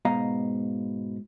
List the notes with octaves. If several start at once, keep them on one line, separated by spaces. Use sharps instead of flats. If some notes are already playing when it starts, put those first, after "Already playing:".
G#2 B2 D#5 F5 A#5